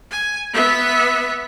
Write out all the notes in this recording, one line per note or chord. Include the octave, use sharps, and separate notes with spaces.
G#5
B3 E5